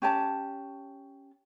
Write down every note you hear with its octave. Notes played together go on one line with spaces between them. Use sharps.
C#4 G4 C#5 A5